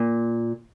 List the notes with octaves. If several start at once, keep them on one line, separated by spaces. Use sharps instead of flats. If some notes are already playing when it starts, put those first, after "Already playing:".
Already playing: A#2